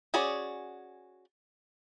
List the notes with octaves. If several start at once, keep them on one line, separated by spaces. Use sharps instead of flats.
C#4 F#4 G#4 D5